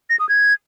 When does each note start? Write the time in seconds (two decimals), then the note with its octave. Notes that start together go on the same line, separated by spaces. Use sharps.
0.10 A#6
0.19 D#6
0.29 G#6